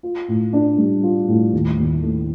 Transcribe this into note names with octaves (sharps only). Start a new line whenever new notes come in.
F4
A2
D4
G3
F4
A2
D#2
D#2
A3